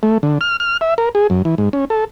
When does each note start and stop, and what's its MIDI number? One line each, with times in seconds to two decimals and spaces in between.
0.03 0.18 57
0.23 0.38 50
0.41 0.57 89
0.60 0.77 89
0.81 0.94 76
0.98 1.09 70
1.15 1.27 68
1.30 1.42 42
1.45 1.55 52
1.58 1.69 44
1.73 1.85 61
1.90 2.05 69